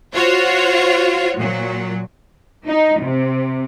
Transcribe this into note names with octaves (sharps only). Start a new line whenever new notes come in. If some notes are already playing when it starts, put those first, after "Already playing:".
F4 F#4 C5 C#5
A#2 F#3
D#4
C3